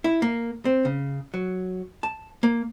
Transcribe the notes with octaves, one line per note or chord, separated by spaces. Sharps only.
E4
A#3
C4
C#3
F#3
A5
A#3